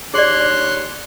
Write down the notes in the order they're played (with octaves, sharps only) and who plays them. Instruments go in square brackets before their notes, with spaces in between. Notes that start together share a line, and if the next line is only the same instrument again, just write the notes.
[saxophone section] D#2 D4 C#5 [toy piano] G#4 D5 [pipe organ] C6 F#6